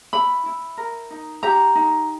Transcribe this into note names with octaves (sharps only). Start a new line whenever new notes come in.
E4 B5
E4
A#4
D#4
G4 A#5
D#4